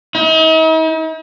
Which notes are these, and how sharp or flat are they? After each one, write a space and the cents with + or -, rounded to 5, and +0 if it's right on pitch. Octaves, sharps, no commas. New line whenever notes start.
D#4 +45